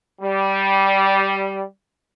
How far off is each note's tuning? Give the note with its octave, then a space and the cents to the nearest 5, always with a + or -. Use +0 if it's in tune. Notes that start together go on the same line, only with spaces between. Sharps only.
G3 -10